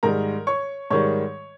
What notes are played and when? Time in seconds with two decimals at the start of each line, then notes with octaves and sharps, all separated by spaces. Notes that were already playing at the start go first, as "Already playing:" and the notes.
0.03 G#2 D#3 G3 A#4 A#5
0.47 C#5 C#6
0.90 G#2 D#3 G3 C#5 C#6